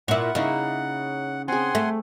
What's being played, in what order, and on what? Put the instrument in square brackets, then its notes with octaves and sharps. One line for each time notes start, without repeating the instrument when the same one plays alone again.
[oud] A#2 E4 [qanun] B4 C#6 [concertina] F#5
[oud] C#3 [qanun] A#3 D#4 E4
[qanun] C4 G#4 [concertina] F#5 G#5 C6
[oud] A3